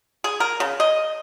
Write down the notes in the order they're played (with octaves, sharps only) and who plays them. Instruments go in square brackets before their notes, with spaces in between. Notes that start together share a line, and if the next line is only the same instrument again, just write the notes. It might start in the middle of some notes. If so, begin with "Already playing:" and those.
[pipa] G#4
A#4
C#3
D#5